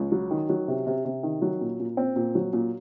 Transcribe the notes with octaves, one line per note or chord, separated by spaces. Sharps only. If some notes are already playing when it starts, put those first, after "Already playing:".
Already playing: C#2
F#3
D#3
F#3
C3
C3
C3
D#3
F#3
A#2
A#2
C4
A#2
F#3
A#2